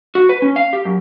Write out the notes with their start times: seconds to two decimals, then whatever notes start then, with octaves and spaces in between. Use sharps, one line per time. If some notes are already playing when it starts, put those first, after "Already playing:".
0.15 F#4
0.29 B4
0.42 C#4
0.56 F5
0.73 G4
0.85 F#2